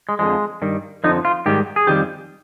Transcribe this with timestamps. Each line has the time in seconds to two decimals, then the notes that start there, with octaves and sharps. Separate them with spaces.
0.09 G#3
0.19 F2 D3 F3 G#3
0.62 G2 D#3 G3
1.04 F2 D3 F3 D#4
1.25 F4
1.46 G#2 D#3 G3 G4
1.76 G#4
1.87 F2 D#3 G3 G4